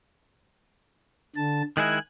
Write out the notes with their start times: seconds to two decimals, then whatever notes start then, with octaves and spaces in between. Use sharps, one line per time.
1.36 D3 A5
1.77 D#3 G#3 E4 G#5 F#6